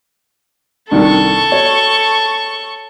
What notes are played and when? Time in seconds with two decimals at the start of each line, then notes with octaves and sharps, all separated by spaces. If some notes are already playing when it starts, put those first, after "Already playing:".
0.91 C2 D#3 D4 A4 C#6
1.52 F#4 C#5